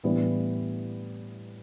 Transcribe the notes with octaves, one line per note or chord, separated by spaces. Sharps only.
A2 E3 G3 B3 D4